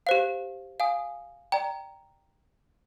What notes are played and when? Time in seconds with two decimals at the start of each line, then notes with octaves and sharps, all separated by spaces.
0.07 G4 C5 F5
0.80 F5 G#5 D#6
1.52 D5 G5 A#5